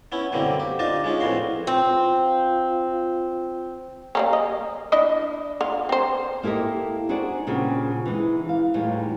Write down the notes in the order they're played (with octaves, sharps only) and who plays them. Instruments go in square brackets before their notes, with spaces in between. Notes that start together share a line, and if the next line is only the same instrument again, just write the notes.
[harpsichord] B3 C#4 E4
F#2 B2 D3 G3 A#3 C4
G4
D4 D#4 F4 D5 D#5
G#3 C#4 F4
F2 A2 B3 F#4 C6
[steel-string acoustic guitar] C4 [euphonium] F4
[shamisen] G3 A#3 C#4
D#5
D4 E4 D#5
D3 F4
C4 C5
[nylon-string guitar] A#3 E4 G4 A4 D#5
D4 D#4 F#4 G#4 C5 D5
A#2 C#3 G3 B3 C4 D4
E3 G#3 D#4
F5
E2 A2 G3 D#4 F4 C#5